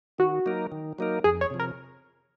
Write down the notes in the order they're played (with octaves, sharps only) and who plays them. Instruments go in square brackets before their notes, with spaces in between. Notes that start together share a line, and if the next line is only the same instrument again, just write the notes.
[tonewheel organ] D#3 [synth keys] F#4
[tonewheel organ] F#3 A#3 D#4 A#4
D#3
F#3 A#3 D#4 A#4
[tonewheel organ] F2 [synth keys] G#4
[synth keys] C#5
[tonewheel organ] C3 F3
[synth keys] A#4